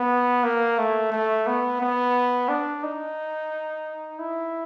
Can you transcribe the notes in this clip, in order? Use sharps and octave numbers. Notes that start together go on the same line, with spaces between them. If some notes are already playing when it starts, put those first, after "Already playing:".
Already playing: B3
A#3
A3
A3
B3
B3
D4
D#4
E4